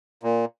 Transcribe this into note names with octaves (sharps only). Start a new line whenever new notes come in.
A#2